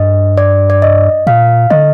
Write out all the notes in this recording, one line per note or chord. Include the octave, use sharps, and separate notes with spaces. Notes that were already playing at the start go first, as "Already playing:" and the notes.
Already playing: G2 D#5
D5
D5
D#5
A#2 F5
D3 D#5